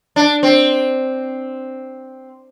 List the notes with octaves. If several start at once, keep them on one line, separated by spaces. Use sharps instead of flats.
D4
C4